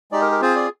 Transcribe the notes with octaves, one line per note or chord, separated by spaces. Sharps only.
G#3 D#4 G4 D5
A#4
A#4
C4 F4 G#4 C5
D5